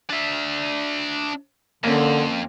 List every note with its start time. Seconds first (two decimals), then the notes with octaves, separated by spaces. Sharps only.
0.10 D4 E5
1.84 F2 D3 A#3 C#4